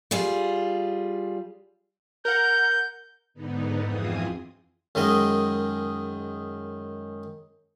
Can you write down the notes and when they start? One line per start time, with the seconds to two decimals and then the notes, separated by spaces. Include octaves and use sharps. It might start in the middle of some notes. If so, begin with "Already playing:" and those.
0.11 G3 F4 G#4
2.25 A#4 F#5 G6
3.34 G#2 D3 B3 D#4
3.83 F2 E3 C4 F4 G#4 D#6
4.95 F#2 D#3 G#3 D#5